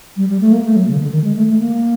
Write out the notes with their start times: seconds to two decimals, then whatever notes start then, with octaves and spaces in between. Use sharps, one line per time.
0.17 G3
0.29 G3
0.41 A3
0.52 A#3
0.64 A3
0.76 F#3
0.88 C#3
0.95 D#3
0.99 D3
1.11 D#3
1.24 G#3
1.36 A3
1.47 A3
1.59 A#3